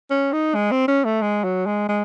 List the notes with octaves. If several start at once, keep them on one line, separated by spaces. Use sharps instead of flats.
C#4
D#4
G#3
C4
C#4
A3
G#3
F#3
G#3
G#3